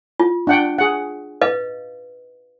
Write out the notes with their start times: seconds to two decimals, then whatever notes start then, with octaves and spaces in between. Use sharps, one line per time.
0.20 F4
0.47 D4 F#5 G5
0.78 G#4 F#5
1.42 B4 D#5 F5